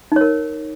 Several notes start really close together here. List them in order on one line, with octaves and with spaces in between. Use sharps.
D#4 C#5 A#4